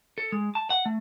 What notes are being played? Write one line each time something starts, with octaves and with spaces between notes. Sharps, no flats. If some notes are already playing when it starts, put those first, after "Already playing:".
A4
G#3
A5
F#5
A3